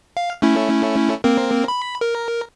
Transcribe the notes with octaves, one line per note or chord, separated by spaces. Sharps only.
F5
A3 C#4 E4
A#3 C4 A#4
B5
A#4